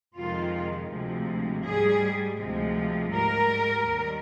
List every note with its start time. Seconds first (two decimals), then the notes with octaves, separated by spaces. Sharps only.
0.16 F2 C3 D#3 G#3 F4
0.90 D2 C3 F3 G#3
1.65 G#2 G3 G#4
2.39 D2 C3 F3 G#3
3.13 G#2 G3 A#4
3.87 D#2 D#3 G3